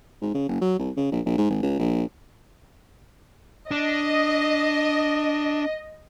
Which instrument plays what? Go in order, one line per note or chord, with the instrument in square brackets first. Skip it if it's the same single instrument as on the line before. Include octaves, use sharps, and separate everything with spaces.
[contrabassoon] G#2
C#3
F#1
F#3
C2
C#3
A#1
A#1
G#2
G#1
C#2
A#1
[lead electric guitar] D4 [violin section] D#5